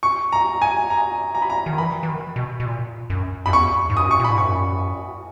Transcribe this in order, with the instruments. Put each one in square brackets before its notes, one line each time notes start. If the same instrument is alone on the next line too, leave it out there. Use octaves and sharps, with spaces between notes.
[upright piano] C#6
A#5
G#5
A#5
A#5
B5
A#5
[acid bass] D#3
[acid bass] E3 [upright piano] B5
[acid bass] E3
D#3
B2
B2
A#2
F#2
[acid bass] F#2 [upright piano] B5
[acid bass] E2 [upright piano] C#6
[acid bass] G#2
[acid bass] F#2 [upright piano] D#6
[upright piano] C#6
[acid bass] A#2 [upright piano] B5
[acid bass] G#2
[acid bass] F#2 [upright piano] C#6